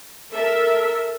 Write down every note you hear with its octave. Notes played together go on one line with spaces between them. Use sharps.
A4 A#4 E5